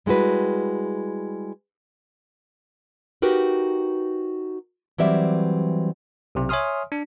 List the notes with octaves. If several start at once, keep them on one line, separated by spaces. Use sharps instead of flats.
G3 G#3 E4 F#4 B4
D#4 F#4 G4 A#4 B4
E3 F#3 G3 C4 D5 E5
B1 C3
C#5 E5 G#5 C6 D#6 F6
D4